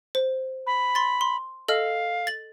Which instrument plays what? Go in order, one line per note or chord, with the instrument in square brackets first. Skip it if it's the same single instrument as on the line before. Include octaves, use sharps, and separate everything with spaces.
[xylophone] C5
[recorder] B5
[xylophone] C6 A6
C6
[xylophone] A4 D#5 F6 [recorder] F5
[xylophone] A6 F#7